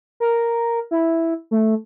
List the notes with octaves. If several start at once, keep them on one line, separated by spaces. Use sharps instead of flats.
A#4
E4
A3